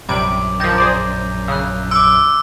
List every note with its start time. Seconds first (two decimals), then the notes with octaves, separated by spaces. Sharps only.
0.09 A#1 F#2 C3 G3 D6 D7 F#7
0.60 D#3 F3 A#5 G6 A#6
0.78 G#4 C5 D5
1.48 C#3 E6 F#6
1.91 C6 D6 E6 D7